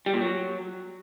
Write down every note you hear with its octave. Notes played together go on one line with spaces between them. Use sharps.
G3
A#2
F#3